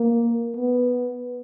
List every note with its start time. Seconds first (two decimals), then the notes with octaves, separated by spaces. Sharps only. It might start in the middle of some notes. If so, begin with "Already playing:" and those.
Already playing: A#3
0.57 B3